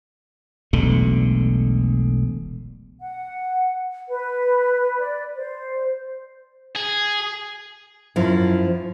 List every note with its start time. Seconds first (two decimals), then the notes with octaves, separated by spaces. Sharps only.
0.73 E1 B1 D3 A3
3.01 F#5
4.09 B4
4.99 D5
5.37 C5
6.76 G#4
8.16 F#2 F3 E4